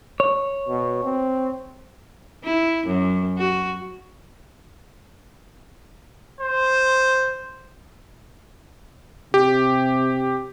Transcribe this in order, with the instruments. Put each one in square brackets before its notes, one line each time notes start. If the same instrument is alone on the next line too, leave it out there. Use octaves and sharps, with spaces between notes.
[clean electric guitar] C#5
[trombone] B2
C4
[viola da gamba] E4
F#2
F#4
[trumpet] C5
[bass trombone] C3 [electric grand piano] G4